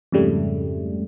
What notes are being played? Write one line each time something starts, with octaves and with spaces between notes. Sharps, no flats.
F2 G#2 C#3 G3 A3